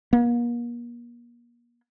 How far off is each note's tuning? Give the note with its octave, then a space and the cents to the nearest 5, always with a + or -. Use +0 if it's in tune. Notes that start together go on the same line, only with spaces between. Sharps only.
A#3 +40